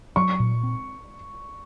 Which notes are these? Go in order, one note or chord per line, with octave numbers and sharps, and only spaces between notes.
F#3 C#6
A#2
C4